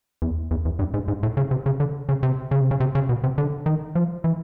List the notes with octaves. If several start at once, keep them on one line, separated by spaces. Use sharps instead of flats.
E2
E2
E2
G2
G#2
G#2
A2
C#3
C3
C#3
D3
C#3
C3
C#3
C3
C#3
C3
C#3
B2
C3
D3
D#3
F3
E3